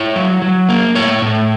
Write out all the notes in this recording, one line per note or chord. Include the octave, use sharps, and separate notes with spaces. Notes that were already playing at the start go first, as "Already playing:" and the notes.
Already playing: E4 C#5
F#3
F#3
A#3
A2 C#5
A2